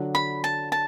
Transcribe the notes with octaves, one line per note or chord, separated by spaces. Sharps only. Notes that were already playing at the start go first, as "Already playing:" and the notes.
Already playing: D3 F#3 D4 F#4
B5
A5
A5